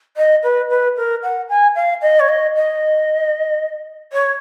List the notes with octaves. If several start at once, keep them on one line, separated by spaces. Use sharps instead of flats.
D#5
B4
B4
A#4
F#5
G#5
F5
D#5
C#5
D#5
D#5
C#5